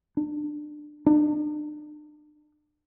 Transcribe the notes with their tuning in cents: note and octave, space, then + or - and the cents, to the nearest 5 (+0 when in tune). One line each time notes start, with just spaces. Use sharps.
D4 +20
D4 +40